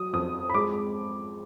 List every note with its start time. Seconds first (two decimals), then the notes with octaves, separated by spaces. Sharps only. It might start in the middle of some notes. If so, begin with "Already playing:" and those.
Already playing: F#3 D#6
0.13 F2 D#6
0.50 B5
0.54 G#3 D6